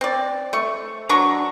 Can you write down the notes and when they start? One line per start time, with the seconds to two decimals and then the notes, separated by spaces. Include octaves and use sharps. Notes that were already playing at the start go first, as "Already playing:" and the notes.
0.01 C4 D5
0.53 A3 C#6
1.09 F#3 D4 A#5 C#6